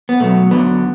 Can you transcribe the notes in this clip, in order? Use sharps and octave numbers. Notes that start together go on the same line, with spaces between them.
B3
B1 B2 F#3 A3
D2 D3 F#3 B3